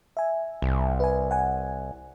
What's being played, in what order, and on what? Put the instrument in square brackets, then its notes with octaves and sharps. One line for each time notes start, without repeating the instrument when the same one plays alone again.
[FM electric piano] E5 G#5
[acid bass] C2
[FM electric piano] B4 G#5
F#5 G#5